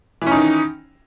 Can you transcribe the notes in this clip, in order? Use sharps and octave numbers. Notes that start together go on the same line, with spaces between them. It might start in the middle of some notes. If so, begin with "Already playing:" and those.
D#3 E3 C#4 D#4